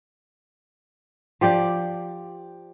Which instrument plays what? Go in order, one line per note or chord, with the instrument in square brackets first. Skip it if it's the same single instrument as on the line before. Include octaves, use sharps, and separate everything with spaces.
[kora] F3 G4 D5 G5